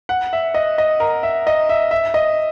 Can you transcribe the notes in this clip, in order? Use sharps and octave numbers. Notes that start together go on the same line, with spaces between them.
F#5
E5
D#5
D#5
A#4
E5
D#5
E5
E5
D#5